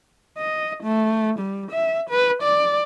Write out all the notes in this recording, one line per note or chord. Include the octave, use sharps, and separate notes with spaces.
D#5
A3
G3
E5
B4
D5